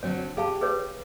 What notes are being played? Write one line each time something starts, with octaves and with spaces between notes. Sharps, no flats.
D3 F#3 C4 C#5
G4 G#4 F5 A5
G#4 B4 C#5